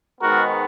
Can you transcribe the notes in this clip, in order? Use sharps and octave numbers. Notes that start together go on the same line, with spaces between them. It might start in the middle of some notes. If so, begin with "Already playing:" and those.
G#2 D#3 G#3 B3 F#4 A#4